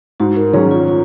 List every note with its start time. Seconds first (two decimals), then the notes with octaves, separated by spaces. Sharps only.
0.20 G#2 F#4
0.37 A#4
0.53 D#3 F#3 C#4 G#4
0.71 F4
0.88 F4